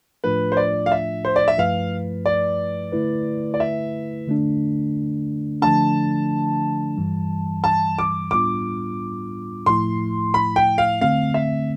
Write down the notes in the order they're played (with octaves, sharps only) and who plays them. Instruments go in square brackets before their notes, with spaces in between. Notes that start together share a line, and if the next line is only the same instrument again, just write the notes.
[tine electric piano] A2 F3 A3 D4 F4 [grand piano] B4
[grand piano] C5
D5
F5
E5
C5
D5
E5
[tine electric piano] G2 F3 A3 E4 B4 [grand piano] F5
[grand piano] D5
[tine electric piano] D3 A3 E4 B4
[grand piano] D5
E5
[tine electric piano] D3 A3 D4
[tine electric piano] D3 F3 A3 D4 [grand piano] A5
[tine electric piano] G2 E3 G3
[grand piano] A5
D6
[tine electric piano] A2 G3 B3 D4 F4 [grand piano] D6
[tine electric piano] A2 F3 A3 E4 [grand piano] C6
[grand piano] B5
G5
F5
[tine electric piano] D3 A3 C4 [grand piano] F5
[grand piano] E5